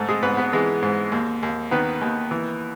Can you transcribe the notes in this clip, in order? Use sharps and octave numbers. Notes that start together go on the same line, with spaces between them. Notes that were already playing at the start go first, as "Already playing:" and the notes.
Already playing: G#2 A3 A4
G#3 G#4
G#2 B3 B4
B3 B4
E3 G#3 G#4
G#2
D#2
D#2
D#3 B3 B4
D#2
E3